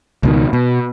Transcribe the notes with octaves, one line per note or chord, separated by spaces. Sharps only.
C#2 B2 D#3
B2